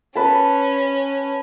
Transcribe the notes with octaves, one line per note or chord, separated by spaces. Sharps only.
C#4 B4 A5